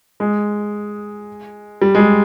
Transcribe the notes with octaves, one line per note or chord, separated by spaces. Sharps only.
G#3
G3
G#3
G3